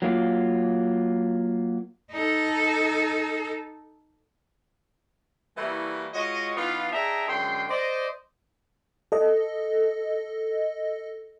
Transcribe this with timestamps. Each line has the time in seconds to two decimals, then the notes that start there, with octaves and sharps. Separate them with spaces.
0.02 F#3 A#3 F4
2.12 D#4 A4
5.57 E3 G3 A3 A#3 E4 F#4
6.14 G#3 F4 F#4 C#5 D#5
6.56 E3 B3 D#4 F4
6.93 D4 G#4 D#5 E5 G5 A#5
7.28 F#2 D3 G#3 G5 C6
7.70 C5 D5 D#5
9.12 A4 D#5